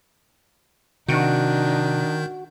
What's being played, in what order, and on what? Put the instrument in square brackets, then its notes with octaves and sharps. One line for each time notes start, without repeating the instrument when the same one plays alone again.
[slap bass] C3 [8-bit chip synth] D#3 G6 [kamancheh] D4 D#4 [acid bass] F#4